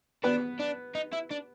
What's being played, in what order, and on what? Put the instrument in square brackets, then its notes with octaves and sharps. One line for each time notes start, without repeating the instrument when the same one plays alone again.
[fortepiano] B3 B4 [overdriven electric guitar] D4
[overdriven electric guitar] D4
D#4
E4
D4